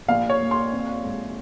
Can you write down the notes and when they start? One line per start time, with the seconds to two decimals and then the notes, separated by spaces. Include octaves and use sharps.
0.08 A#1 F5
0.30 C#5
0.41 A#2
0.51 C6
0.73 C4
1.04 G#2